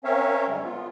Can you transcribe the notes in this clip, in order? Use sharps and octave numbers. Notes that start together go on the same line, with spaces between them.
C4 C#4 A#4 C#5 E5 F5
F#2 D3 G3 G#3
B3 F4